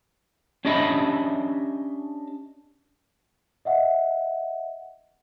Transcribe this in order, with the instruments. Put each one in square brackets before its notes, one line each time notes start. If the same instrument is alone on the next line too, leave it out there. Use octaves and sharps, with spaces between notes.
[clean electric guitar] C#4 D4 G4 D#5 E5 B5
[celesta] D#5 E5 F#5